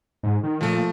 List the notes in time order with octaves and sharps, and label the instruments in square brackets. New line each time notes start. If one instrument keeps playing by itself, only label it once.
[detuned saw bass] G#2
D#3
[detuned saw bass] A#2 [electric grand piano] F3 A3